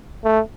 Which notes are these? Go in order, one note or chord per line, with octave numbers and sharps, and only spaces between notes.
A3